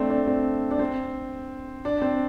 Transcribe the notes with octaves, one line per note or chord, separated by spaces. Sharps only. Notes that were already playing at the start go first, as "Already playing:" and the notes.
Already playing: A3 C4 D4
D4
C4
D4
C4
D4
C4